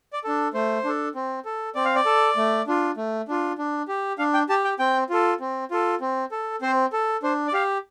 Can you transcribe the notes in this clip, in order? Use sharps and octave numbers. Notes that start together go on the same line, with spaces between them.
D5
D4 A4
A3 C5
D4 A4
C4
A4
C4 D5
F5
D5
A4
A3
D4 F4
A3
D4 F4
D4
G4
D4 F5
G5
G4 A5
G5
C4 G5
F4 A4
C4
F4 A4
C4
A4
C4 C5
A4
D4 C5
D5
G4 F5